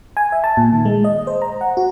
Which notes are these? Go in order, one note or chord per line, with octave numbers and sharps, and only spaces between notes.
G#5
E5
A5
A#2
D#3
G#3
D#5
C5
A#5
F#5
F#4